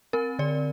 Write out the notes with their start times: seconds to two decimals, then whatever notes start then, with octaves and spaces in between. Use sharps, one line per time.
0.13 C4 A#4
0.39 D3 D5